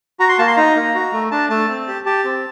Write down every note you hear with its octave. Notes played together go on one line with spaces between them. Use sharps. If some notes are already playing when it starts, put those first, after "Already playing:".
F#4 A#5
C6
A#3 A5
C6
D#4 A#5
A#3
F#4
A3
D4 A5
A3 A5
C4
G4
G4 A5
C4